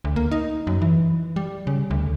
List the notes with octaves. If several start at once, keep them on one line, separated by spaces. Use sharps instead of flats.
D2
A#3
D#4
F#2
E3
G3
C#3
D2